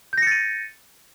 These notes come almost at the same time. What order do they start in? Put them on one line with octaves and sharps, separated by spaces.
G6 A#6 C#7 A6 D#7